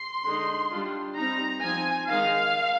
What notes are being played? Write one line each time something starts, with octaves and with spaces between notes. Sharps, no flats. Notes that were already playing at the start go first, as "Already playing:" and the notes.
Already playing: C6
D3 G#3 D#4
G3 D4 F4
G3 C4 D#4 A#5
F3 C4 D#4 G#5
D#3 G#3 D#4 F5